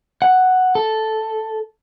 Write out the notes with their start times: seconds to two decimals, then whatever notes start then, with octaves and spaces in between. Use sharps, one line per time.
0.22 F#5
0.75 A4